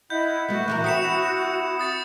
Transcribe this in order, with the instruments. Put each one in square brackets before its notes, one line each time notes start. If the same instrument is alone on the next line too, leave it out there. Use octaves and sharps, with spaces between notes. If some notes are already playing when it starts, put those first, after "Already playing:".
[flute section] E4 D#5 [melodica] F#5 B5 [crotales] G6
[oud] A3 B3 [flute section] F#4
[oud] E3 E4 A#4
[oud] C4 [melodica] G5 B5 C#6 [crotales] D#6 C#7 E7
[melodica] E4
[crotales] D#6 A6 C#7